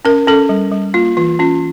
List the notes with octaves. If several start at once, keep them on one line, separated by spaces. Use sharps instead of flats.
C#4 A#4
C#4 A4
G3
G3
A#3 F4
E3 F4
C#4 F4